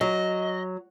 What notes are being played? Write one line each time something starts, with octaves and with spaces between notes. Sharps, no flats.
F#3 D#5